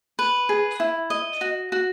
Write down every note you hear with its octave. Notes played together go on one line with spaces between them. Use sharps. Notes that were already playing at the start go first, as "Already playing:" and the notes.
B4
G#4
E4
D#5
F#4
F#4